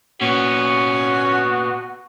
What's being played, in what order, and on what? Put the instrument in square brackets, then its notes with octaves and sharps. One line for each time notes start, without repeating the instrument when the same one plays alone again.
[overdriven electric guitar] A#2 B3 [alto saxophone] C#4 [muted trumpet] F#4